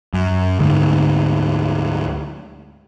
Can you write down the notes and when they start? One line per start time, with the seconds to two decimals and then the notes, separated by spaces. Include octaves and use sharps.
0.14 F#2
0.59 D2 G#2